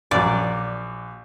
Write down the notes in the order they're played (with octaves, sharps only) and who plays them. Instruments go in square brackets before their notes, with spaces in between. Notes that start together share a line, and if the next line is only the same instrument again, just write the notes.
[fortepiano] A#1 F#3 [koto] D5